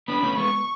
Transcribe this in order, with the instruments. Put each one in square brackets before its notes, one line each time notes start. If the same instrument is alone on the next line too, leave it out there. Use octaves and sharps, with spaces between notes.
[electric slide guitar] B3 D4 [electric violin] B5
[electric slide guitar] A3 C#4
[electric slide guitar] G#3 B3 [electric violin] C#6